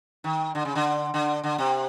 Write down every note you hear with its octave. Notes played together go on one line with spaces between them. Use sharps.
D#3
D3
C#3
D3
D3
D3
C3